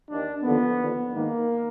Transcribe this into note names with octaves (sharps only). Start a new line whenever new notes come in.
D#2 D#3 D4
D#2 D3 F3 B3
D#2 D3 F3
G#2 D#3 A#3